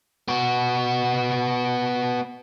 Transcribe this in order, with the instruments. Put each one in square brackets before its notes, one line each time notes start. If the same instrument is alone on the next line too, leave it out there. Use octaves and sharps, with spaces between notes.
[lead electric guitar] B3 F#4